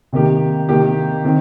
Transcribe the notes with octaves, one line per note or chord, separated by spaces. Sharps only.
C3 D#3 A#3 G4
C3 D#3 A#3 G4
D#3 C4